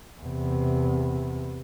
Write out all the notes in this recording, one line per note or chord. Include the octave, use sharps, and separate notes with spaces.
E2 C3